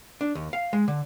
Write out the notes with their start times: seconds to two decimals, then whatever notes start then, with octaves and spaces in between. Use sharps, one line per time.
0.21 D4
0.35 D#2
0.53 F5
0.73 G#3
0.88 D3